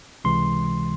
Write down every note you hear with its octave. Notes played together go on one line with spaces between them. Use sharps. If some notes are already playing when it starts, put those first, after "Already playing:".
C#2 C3 E3 G#3 C6